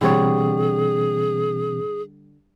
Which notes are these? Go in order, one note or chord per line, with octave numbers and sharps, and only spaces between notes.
B2 D3 E3 G3 C4 G#4 C#5